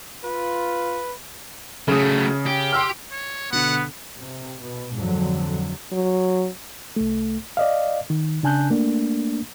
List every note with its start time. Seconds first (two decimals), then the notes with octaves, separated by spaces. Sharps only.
0.24 F4 B4
1.88 C#3 F#3 A3 D#6
2.46 G4
2.73 C6 E6 F6
3.11 C#5
3.53 B2 D3 B3 F#5
4.18 C3
4.61 B2
4.97 F2 G#2 D3 F#3
5.92 F#3
6.96 C2 A3
7.57 D5 D#5 F5
8.10 D#3
8.43 C#3 D4 G#5 A5 F#6 G6
8.70 A3 A#3 D4